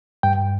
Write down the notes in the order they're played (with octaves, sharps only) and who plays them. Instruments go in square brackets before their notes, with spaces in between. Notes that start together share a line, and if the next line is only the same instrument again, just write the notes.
[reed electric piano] G2 G5